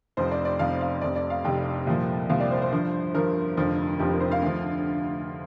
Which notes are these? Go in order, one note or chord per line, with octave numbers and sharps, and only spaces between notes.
F1 F2 F3 C5
D5
D5
F1 F2 F3 F5
F5
F1 F2 C3 D5
D5
F5
F1 F2 C3 G5
C2 A#2 F3
C2 A#2 F3 F5
D5
C5
C5
G1 G2 F3
G1 G2 F3 A#4
F1 F2 D3 F3
F1 F2 D3 F3 G4
A#4
C5
F5
D2 D3 F3